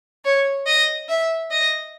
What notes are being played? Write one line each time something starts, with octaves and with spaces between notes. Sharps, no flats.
C#5
D#5
E5
D#5